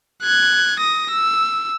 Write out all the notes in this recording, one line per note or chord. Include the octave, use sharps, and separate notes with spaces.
F#6 G#6
D#6 A#6
E6